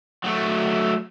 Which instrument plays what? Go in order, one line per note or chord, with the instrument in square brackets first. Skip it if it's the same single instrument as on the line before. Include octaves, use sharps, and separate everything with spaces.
[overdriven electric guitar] F#3 A3